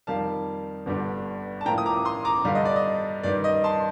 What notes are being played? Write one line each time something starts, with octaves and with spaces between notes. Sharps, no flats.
F2 D#3 G3 A#3 F5 A5
G1 G2 D3 G3 D4
A5
A2 F3 A#3 G5 A#5
D#6
A#5 D6
C6 D#6
A#5 D6
G2 D3 G3 D4 F5
D#5
D5
D#5
G2 D#3 G3 D5
D#5
A5 C6